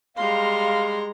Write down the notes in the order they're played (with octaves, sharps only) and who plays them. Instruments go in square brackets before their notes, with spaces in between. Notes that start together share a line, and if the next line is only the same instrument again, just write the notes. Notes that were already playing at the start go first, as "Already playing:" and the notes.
[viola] G3 C6 [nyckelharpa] G#3 A#5 [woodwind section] F5